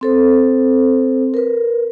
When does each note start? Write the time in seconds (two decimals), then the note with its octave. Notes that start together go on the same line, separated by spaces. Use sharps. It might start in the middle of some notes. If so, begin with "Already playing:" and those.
0.01 C4 A4 C5
1.34 A#4 B4